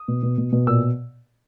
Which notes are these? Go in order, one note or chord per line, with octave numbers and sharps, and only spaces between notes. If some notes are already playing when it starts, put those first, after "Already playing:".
Already playing: D#6
B2
B2
B2
B2
A#2 E6